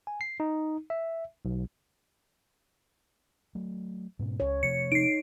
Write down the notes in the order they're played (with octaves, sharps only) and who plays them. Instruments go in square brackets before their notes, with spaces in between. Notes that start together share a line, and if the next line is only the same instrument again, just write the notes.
[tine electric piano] G#5
C7
D#4
E5
B1
[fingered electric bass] F#3 A3
G#2 B2 C#4
[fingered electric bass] C#2 C#4 [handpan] C#5
[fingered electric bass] C3 F3 A3 [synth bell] C#7
[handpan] D#4 [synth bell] C7 D7